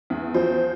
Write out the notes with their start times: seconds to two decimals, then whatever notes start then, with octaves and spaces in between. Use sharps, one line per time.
0.10 E2
0.34 F3 C5